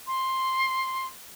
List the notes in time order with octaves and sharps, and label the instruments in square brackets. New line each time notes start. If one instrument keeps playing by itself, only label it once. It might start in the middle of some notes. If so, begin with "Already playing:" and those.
[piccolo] C6